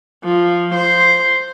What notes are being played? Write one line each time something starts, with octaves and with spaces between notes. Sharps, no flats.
F3
C5